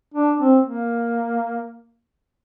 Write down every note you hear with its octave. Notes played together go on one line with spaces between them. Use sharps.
D4
C4
A#3